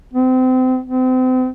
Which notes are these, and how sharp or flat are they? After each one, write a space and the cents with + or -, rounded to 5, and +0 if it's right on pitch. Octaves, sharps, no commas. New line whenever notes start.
C4 -30
C4 -35